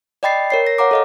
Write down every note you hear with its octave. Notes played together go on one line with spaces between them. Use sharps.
D5 D#5 G5 B5 A6 C7
A#4 C#5 C7
A#6
C#5 F5 F#5 A#5 D6
A4 D#5 F5